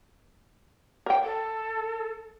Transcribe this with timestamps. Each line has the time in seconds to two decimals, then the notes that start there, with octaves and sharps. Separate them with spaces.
1.06 A#4 G5
1.24 A4